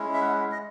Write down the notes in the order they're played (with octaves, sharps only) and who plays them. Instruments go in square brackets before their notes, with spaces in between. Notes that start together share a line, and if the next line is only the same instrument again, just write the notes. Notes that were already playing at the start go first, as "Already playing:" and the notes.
Already playing: [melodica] G#3 C#4 E4
E5
F#5
D#5